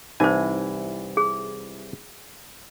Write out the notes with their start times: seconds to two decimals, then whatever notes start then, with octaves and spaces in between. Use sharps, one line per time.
0.20 C2 E3 D#4 C5 G#5
1.17 G#4